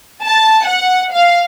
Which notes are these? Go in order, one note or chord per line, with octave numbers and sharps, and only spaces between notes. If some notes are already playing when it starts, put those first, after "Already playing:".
A5
F#5
F5